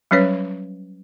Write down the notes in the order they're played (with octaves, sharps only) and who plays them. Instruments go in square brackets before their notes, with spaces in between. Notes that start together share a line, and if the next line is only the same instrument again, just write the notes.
[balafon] F#3 G3 C#4 B4 C#5